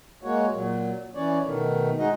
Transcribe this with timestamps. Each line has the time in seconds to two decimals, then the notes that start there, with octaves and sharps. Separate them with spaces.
0.23 G#3 A#3 F#4 C#5
0.52 A#2 F#3
1.15 E3 C#4 C#5 D5
1.44 B2 D#3 A3
1.98 G#3 D#4 F#4 D#5